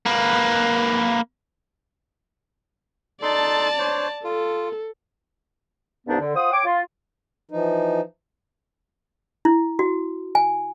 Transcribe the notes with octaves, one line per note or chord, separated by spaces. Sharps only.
A#3 B4
D#4 A4 D5 A5 C6
D4 C5 C#5
F4 A4
C2 G2 B3 D4 D#4
D3
F4 C5 F#5 D#6
C#5 G5 D6
F4
E3 F3 D#4
E4
F#4
G#5